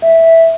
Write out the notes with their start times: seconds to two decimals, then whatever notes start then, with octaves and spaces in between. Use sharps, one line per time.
0.02 E5